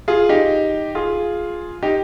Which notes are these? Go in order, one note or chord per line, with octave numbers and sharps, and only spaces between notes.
F4 G#4
D#4 G4
F4 G#4
D#4 G4